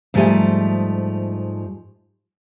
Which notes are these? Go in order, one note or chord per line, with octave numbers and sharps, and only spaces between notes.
G#2 E3 F3 G3 A3 G#5